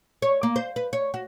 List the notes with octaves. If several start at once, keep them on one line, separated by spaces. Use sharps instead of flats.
C#5
A#3
C5
B4
C#5
F#4